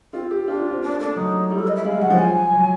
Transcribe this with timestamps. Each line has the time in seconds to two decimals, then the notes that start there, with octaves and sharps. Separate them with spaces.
0.13 C4 F4
0.31 G4
0.48 D4 F4
0.59 F4
0.71 C4
0.82 A#3 D4
0.99 A3 D4
1.16 F#3 D#4
1.50 G3 E4
1.58 A4
1.67 D#5
1.76 E5
1.85 G#3 F5
1.93 G3
2.01 F#3 F#5
2.10 F3
2.18 G#5
2.53 F#3